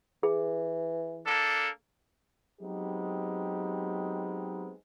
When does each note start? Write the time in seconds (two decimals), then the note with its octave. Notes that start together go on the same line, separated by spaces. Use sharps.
0.23 E3 G#4
1.27 A#3 D4 A4
2.60 F#3 G#3 B3 C4 D#4 G4